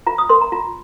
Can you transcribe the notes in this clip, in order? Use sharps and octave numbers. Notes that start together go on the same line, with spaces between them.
F4 A#5
D#6
A#4 C6
A#5
F4 A#5